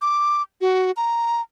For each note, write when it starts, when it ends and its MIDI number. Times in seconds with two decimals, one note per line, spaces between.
0.02 0.42 86
0.61 0.91 66
0.97 1.41 82